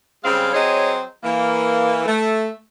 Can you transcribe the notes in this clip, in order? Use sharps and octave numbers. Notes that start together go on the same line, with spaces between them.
C#3 G3 G#3 C4 F5
F#3 C4 G#4 C5 C#5 D#5
E3 A#3
A3